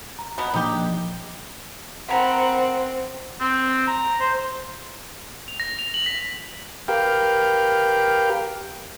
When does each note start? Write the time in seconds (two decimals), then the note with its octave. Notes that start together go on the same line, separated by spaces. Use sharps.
0.19 A#5
0.38 B2 B3
0.54 A#2 F3 D4 D#4 G4
2.09 C4 A#4 F#5 A#5 B5
3.40 C4
3.87 A#5
4.20 C5
5.48 F7
5.60 A#6
5.79 F7
5.94 F#7
6.06 B6
6.88 G4 A#4 B4 F5 G5